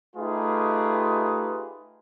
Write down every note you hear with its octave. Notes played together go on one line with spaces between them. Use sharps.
A3 D#4 F4 G4 G#4 B4